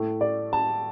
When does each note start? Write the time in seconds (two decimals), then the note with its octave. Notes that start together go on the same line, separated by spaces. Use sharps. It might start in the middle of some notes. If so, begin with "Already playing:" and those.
Already playing: A2 A3
0.21 D5
0.53 A5